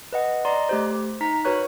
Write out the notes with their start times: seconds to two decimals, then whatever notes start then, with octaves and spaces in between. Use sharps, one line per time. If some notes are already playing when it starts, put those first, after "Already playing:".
0.13 B4 D#5 F#5
0.45 D5 D#5 A#5 C6
0.69 A3 G4 C5
0.91 C5
1.21 D#4 A#5 B6
1.45 F#4 A#4 B4 C#5 C#6 F#6